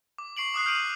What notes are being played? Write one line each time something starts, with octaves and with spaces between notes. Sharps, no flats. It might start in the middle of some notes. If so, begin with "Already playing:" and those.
D6
C#6 C7 D7 F#7
D6 D#6 F#6 C7
F6 G6 C7 D7 D#7 F#7